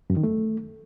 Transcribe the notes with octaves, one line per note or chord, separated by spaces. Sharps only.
F#2
D#3
A3